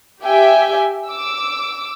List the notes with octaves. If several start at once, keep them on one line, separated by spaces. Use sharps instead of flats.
G4 E5 G5 G#5
D6 E6